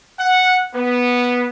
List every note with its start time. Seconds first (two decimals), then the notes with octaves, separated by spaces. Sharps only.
0.19 F#5
0.74 B3